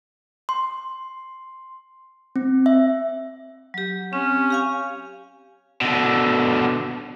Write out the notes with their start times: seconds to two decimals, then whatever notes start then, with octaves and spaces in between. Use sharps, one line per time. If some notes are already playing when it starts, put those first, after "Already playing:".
0.49 C6
2.36 C4
2.66 E5
3.74 F#3 G4
4.13 C4 C#4
4.50 G4 F5 G#5
5.81 B2 D3